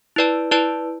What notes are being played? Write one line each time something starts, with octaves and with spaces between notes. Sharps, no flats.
E4 B4 D5 A5
E4 B4 D5 A5